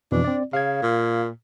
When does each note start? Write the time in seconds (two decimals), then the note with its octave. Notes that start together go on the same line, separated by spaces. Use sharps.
0.12 F2 B2 E3 D4
0.24 C4 D5
0.53 C#3 F5 G#6
0.82 A#2